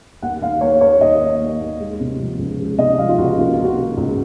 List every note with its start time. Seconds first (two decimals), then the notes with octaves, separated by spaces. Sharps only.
0.22 D#2 F#5
0.42 D#3 F5
0.61 A#3 C#5
0.81 D#2 C#5
1.01 D#2 D#5
1.21 D#3
1.40 A#3
1.60 D#2
1.80 G#3
2.00 C3
2.19 F3
2.39 C#2
2.59 G#3
2.78 C3 D#5
2.98 F3 F5
3.09 F4
3.18 C#2 F#4
3.38 A#3 F4
3.57 C3
3.64 F#4
3.78 D#3
3.97 C#2